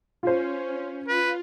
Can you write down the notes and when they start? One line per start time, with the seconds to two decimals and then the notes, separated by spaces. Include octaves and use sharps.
0.23 C#4 F4 C5
1.08 F4 B4